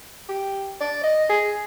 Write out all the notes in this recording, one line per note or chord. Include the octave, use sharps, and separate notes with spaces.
G4
D5
D#5
G#4